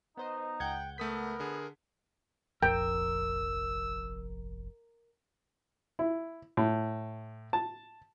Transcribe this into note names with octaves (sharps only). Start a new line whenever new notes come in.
B3 D#4 C5 D#5
C#2 F#5 G5 G6 G#6
A3 B3 A#4 D#6 B6
D3 G#4
F1 A#1 F2 A#4 G5 E6
E4
A2
A5